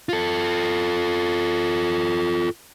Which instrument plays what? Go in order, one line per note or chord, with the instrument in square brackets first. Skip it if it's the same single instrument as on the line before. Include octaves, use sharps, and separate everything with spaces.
[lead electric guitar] F4 A4